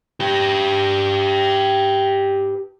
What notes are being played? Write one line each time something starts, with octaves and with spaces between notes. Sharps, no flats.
G4 B4